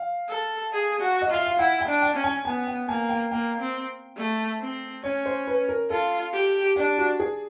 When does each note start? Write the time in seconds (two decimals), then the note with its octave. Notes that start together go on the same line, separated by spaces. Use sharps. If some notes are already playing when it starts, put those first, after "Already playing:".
Already playing: F5
0.30 A4
0.73 G#4
1.01 F#4
1.22 D#5
1.30 F4 E5
1.46 F5
1.59 E4 F#5
1.81 G5
1.88 D4
2.02 G5
2.16 C#4
2.24 G#5
2.45 B3 G#5
2.67 G5
2.88 A#3 G#5
3.09 G5
3.31 A#3 G5
3.60 C4
4.17 A3
4.61 C4
5.04 C#4 C#5
5.26 C5
5.47 B4
5.69 A#4
5.90 F4 A4
6.33 G4
6.76 D4 G4
6.98 F#4
7.20 G#4